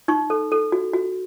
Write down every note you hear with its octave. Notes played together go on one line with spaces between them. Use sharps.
D#4 C#6
A4
A4
F#4
F#4